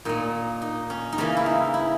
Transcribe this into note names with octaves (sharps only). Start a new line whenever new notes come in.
A#2 A#3 D#4
D#4
C#4
D#4
C#3 E3 A#3 C#4
E4
D#4
E4